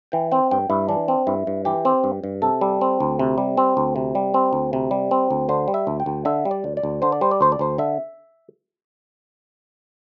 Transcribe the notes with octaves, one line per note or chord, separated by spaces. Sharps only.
E3 G5
C4 G5
G2 G5
G2 E4
E3 D4
C4
G2 E4
G2
E3 G4
C4
G2
G2
C3 A4
G3
C4
D2
C3
G3
C4
D2
C3
G3
C4
D2
C3
G3
C4
D2
D3 C5
G3
E5
D2
G5
D2
D3 E5
G3
D5
D2
D5
D2
D3 C5
D5
G3 C5
D5
D2 C5
D5
D2 C5
D3 E5